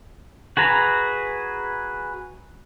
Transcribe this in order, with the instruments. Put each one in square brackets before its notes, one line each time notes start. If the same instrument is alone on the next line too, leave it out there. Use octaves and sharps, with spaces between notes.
[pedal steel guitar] F#4 G#4 B4 A#5